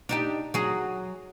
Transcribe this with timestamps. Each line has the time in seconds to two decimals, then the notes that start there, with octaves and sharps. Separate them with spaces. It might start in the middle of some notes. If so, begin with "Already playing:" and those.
0.09 D4 D#4 G4
0.54 F#3 G#4